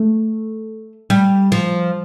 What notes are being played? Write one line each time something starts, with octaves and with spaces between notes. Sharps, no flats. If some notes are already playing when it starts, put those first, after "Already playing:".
Already playing: A3
G3
F3